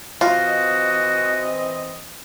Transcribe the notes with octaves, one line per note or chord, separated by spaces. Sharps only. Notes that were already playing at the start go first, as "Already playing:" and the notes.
E3 C4 F4 F#4 D#5